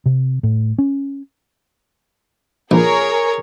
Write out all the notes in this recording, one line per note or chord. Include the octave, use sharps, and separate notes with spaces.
C3
A2
C#4
A#1 G#4 A#4 C#5